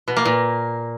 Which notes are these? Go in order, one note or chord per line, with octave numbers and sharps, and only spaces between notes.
B2
A#3
A#2